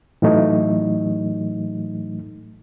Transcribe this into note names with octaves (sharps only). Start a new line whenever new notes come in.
A2 E3 F#3 A3 D#4